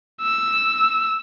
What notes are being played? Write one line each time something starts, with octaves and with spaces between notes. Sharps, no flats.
E6